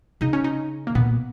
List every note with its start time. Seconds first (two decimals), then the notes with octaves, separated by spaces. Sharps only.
0.21 C#3 D#4
0.33 C#4
0.44 D#4
0.87 A#3
0.95 A#2 B3